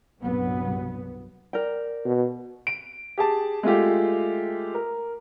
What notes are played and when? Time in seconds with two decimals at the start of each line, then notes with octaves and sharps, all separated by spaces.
0.20 C2 G2 A#2 F#3 B3
1.53 A#4 D5 G5
2.05 B2
2.67 D7
3.18 G4 G#4 A5
3.63 G#3 A3 F4 G4
4.74 A#4